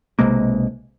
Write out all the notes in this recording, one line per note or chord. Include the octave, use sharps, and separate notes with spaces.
B1 C3 G#3 A#3